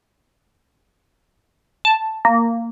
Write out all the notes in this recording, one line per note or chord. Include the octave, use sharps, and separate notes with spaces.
A5
A#3